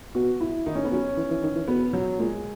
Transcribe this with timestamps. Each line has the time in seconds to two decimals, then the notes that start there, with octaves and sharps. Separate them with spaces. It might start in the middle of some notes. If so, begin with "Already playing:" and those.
0.15 B2 F#4
0.41 E4
0.66 D#3 D#4
0.75 C#4
0.85 B3
0.91 F#3 C#4
1.17 E3
1.30 E3
1.43 D#3
1.56 E3
1.68 B2 B3
1.93 F#3
2.19 A#2 G#3